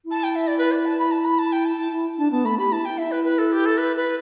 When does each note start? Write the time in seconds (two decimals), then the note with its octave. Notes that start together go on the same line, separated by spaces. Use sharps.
0.05 E4
0.10 A5
0.23 G5
0.35 E5
0.47 D5
0.58 B4
0.71 D5
0.85 A5
0.98 B5
1.11 A5
1.24 B5
1.38 A5
1.52 G5
1.65 A5
1.78 E4
1.92 E4
2.18 D4 A5
2.31 B3 A5
2.45 A3 B5
2.58 G4 B5
2.72 E4 A5
2.85 E4 G5
2.97 E5
3.07 E4 B4
3.24 B4
3.38 A4
3.52 G4
3.65 A4
3.77 B4
3.96 B4